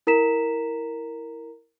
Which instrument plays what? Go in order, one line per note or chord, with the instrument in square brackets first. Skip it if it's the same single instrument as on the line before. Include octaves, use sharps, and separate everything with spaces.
[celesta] E4 A#4 A#5 B6 E7